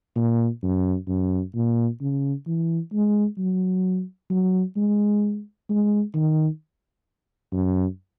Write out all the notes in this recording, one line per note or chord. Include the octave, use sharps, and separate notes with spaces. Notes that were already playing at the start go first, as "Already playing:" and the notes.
A#2
F#2
F#2
A#2
C#3
E3
G#3
F#3
F#3
G#3
G#3
D#3
F#2